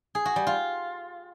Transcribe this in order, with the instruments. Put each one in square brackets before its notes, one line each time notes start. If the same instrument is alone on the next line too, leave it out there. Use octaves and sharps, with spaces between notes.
[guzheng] G#4
F#4
G3
F4